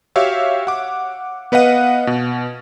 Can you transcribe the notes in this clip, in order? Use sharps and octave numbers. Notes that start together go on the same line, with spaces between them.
F#4 G4 C#5 E5 F5 E6
F#5 D6
B3 B4 D#5 F5 F#5 D#7
B2